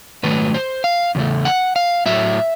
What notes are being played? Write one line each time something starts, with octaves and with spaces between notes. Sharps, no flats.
G#2 D#3 F#3 A3 B4
C5
F5
E2 C#3 A3
F#5
F5
A2 F#3 A3 E5